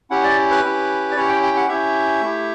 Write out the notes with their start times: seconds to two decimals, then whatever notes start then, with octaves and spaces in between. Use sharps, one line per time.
0.10 C#4 E4 G4 F#5
0.24 D5
0.51 B4
0.64 C#4 E4 G4
1.11 D5
1.16 C#4 E4 G4 C#5
1.29 G5
1.43 G5
1.57 F#5
1.69 C#4 E4 G4 E5
2.22 A3 E4 G4